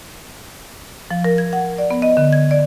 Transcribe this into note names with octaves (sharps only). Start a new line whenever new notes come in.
F3
A#4
G#6
F#5
D5
B3
D#5
D3
G#6
D5